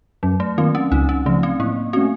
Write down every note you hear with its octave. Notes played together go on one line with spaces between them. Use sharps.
F#2 F#3
A3
D#3 A#3 C4 F4
C#4
C#2 D#4
C#4
C#3 F3 A3
C4
A2 A#3
A3 C4 C#4 F#4